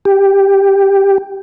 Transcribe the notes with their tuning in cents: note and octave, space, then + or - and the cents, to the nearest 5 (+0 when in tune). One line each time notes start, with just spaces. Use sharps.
G4 +5